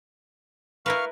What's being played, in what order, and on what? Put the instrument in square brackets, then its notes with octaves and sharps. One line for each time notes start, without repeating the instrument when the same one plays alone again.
[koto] E4 A#4 B4 [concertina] F5 C#6 F6